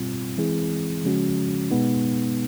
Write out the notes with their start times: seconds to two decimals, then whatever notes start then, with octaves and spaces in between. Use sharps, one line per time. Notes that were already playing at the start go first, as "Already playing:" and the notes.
Already playing: B2 G3 C4 F4
0.37 E3 G#3 C4 E4 G#4
1.04 C#3 F3 G#3 C#4 F#4
1.71 B2 G#3 B3 D#4